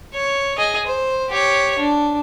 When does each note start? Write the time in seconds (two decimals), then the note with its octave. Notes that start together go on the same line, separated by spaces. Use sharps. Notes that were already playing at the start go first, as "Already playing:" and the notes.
0.14 C#5
0.58 G#4 D#5
0.87 C5
1.30 G4 C#5
1.79 D4